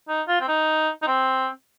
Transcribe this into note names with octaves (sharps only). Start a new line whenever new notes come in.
D#4
F4
C4
D#4
D#4
C4